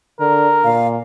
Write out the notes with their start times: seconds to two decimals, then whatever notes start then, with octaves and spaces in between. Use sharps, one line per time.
0.20 D3 A#4
0.64 A#2 F5